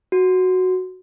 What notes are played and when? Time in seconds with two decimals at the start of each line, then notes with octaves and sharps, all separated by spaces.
0.12 F#4